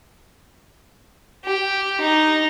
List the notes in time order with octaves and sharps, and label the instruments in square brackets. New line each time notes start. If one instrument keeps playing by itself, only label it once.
[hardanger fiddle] G4
D#4